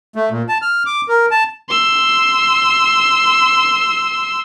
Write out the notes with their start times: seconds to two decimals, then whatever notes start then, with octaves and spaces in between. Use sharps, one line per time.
0.16 A3
0.31 A#2
0.49 A5
0.62 F6
0.86 D6
1.08 A#4
1.31 A5
1.69 C6 E6